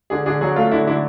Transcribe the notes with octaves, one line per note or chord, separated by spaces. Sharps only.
D3 G#4
D3 G#4
F#3 G#4
A3 F4
D3 E4
D3 E4